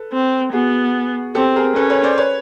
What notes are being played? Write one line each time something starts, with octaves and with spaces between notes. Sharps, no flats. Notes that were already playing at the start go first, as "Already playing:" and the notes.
Already playing: A4 B4
C4
B3 F#4 G#4
C4 G4 A4
G#4 A#4
C#4 A4 B4
B4 C#5
C5 D5
B4 C#5